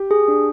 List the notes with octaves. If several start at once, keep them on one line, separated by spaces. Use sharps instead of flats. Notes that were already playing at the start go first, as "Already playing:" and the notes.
Already playing: G4
G#4
D4